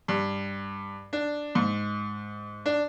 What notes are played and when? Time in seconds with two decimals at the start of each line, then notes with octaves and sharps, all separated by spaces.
0.08 G2
1.13 D4
1.55 G#2
2.66 D4